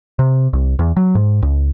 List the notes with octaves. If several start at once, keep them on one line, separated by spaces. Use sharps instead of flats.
C3
C2
E2
F#3
G#2
C#2